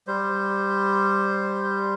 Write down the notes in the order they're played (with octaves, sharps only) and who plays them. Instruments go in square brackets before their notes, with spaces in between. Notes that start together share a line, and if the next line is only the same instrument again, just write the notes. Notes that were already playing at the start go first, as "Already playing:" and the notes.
[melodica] G3 C5